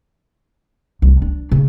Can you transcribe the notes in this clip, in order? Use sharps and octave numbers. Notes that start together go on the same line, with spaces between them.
C2
D4
C#3